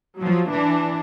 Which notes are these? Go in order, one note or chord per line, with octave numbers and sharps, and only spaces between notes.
F3 F#3
E3 D4